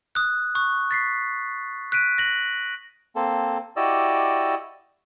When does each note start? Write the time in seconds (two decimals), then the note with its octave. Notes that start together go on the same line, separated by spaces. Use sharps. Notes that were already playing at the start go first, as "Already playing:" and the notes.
0.15 D#6 F#6
0.55 C#6 D#6 F#6
0.91 A6 B6 C7
1.92 F#6 B6 D7 D#7
2.18 A#6 F#7
3.16 A#3 C4 A4
3.76 E4 F#4 G4 D5 D#5 E6